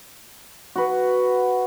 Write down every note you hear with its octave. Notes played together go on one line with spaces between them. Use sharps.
F#4 B4